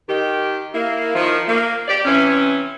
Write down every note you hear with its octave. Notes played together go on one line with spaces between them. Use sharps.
D#3 G4
A#3 E4
D#3 F3
A#3
G4 D5
C3 E3 C#4